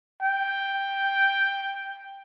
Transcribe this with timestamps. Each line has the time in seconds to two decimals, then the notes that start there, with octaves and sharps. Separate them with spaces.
0.22 G5